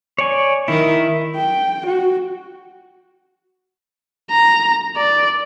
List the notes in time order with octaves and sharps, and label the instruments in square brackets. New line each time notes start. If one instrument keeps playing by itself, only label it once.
[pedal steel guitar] C#5 D5 G#5
[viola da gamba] D#3 [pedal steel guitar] E4
[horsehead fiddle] G5
F#4
[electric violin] A#5
D5